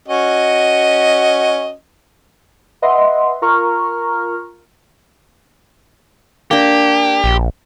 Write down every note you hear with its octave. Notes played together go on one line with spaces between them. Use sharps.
C#4 F#4 D#5
B4 D#5 E5 F#5 C6
F4 A#4 A#5 C#6 F6
A#3 D4 G4
A#1